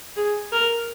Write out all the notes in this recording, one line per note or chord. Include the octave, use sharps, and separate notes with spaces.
G#4
A#4